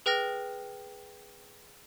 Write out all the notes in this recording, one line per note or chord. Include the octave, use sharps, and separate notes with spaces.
G#4 B4 G5 F6 A#6